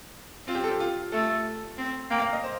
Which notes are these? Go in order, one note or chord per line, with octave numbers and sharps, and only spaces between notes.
C4 F4
G4
A4
G4
F4
A3 A4
C4
A#3 G5
F5
D#5
C5